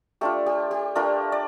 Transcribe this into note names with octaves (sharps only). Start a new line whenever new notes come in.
A3 D4 F4 G4
G4
G4
A3 D4 F4 G4 A#4
D5